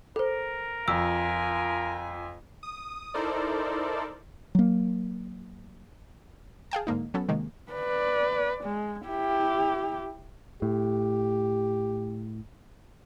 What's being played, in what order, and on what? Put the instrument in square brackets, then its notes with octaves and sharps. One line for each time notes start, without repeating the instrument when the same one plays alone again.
[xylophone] A4 C5 [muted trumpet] A#4
[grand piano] F2 [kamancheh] F4 G#5 [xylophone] E6
[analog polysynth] D#6
D#4 E4 A4 A#4 C5 D5
[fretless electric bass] F#3 A#3
[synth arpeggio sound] G#4 F5 G5 A5
G#2 D3 A#3 D#4
F#3 B3 C#4 A4
C3 D#3 G#3 A#3
[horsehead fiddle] B4 D5
G#3
E4 G4
[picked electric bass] A2 [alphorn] G4